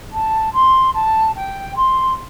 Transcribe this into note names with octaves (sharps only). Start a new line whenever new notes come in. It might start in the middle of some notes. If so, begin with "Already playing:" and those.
A5
C6
A5
G5
C6